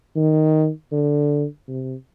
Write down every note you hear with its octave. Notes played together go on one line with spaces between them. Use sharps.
D#3
D3
C3